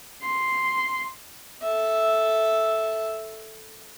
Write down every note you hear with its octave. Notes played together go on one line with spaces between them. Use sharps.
C6
A4 E5